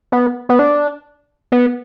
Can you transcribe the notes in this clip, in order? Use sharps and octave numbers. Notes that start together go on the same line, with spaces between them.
B3
B3
D4
B3